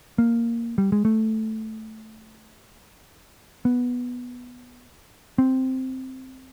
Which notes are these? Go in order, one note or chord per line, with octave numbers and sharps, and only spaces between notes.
A#3
G3
G#3
A3
B3
C4